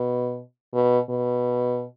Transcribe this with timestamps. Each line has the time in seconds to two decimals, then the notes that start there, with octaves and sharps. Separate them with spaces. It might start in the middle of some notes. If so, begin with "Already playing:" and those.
Already playing: B2
0.74 B2
1.09 B2